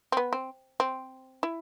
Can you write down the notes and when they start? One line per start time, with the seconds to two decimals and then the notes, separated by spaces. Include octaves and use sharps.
0.12 C4
0.17 B3
0.33 C4
0.80 C4
1.43 E4